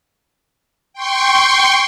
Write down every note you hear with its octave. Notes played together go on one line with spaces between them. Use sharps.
G5 C6 C#6